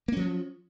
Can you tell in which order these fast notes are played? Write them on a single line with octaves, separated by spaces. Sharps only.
A#3 C#4 F3 F#3